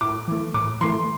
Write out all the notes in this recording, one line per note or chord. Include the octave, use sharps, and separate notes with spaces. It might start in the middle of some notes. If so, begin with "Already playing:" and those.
A2 D6
E3 A3
A2 D6
E3 A3 C6